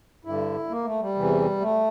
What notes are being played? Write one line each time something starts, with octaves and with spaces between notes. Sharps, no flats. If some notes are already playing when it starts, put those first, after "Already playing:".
G2 D3 E4
A#3
A3
G3
E2 C3 E3
A3